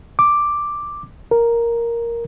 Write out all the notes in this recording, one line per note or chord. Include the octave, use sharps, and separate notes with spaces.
D6
A#4